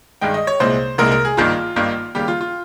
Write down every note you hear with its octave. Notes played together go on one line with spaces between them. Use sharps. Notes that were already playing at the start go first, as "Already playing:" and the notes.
G2 D#3 G#3 G5
D#5
C#5
C2 A#2 G#3 C5
C2 A#2 G#3 A#4
A#4
G#4
G#1 G2 D#3 A#3 F4
G#1 G2 D#3 A#3
D#2 C#3 G3 A#3 G4
F4
F4